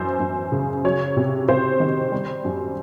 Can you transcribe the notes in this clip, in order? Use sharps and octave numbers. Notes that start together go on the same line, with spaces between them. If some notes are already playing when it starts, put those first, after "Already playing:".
Already playing: F#2 E3 C5
F#2
C#3
F#3 C#5
C3
C3 C5
D#3
G3
F#2